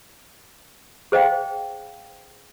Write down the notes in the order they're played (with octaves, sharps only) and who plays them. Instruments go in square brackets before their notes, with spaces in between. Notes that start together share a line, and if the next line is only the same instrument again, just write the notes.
[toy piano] G#4 C5 D#5 F5 G5